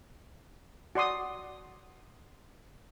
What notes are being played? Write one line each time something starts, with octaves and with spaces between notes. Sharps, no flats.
F#4 D5 C6 D#6